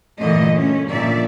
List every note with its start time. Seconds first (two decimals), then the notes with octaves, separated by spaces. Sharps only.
0.19 G2 A#2 D3 E3 A3 D#5
0.59 A3 C#4
0.89 A#2 D3 D#3 F3 D5 E5